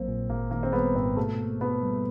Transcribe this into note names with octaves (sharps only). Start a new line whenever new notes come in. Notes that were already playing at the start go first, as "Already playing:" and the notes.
Already playing: A#1 F#3 A#3 C4
A#2
G#1 A#3
D#3 A#3
C4
G3 B3
G#2 C4
B2 A3
A#3
B2 B3
G3